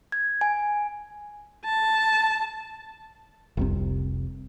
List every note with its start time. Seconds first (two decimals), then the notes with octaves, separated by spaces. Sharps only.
0.12 G#6
0.41 G#5
1.65 A5
3.57 F1 C2 C3